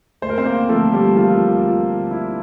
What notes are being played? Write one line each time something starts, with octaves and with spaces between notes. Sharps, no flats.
D2 C5
A#4
C4 C5
A#3 A#4
D3 F3 A3 A4
G3 G4
D2 F3 F4
D3 F3
D2 E4